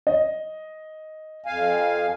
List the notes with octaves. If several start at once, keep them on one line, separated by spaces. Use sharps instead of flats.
D#5
F2 F5 G#5